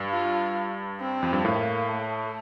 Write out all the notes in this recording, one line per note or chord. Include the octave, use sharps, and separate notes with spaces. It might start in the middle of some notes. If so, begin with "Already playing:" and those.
Already playing: G2
F4
C4
F2
G2
A2 A#3
A3